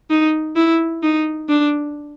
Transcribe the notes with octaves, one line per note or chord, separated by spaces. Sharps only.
D#4
E4
D#4
D4